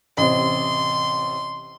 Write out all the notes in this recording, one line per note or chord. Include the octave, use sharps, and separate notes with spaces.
A1 C3 C6